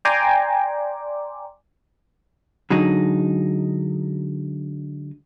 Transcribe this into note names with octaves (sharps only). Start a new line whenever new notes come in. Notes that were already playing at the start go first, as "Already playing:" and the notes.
D5 G5 G#5 A#5 C6 D6
D3 F#3 G#3 D#4